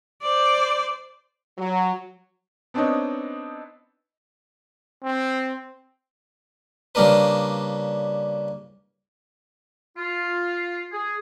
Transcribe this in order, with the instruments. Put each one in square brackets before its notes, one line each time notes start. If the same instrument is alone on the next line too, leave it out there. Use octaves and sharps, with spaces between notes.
[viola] C5 D5
[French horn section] F#3
[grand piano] B3 C4 D4 D#4 C#5 D#5
[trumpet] C4
[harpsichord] C#3 G3 A#3 D4 A#4 B4
[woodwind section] F4
G#4